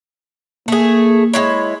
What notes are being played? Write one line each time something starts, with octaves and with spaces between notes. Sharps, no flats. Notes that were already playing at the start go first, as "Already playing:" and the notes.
A3 A#3 G#4
G#3 E4 C#5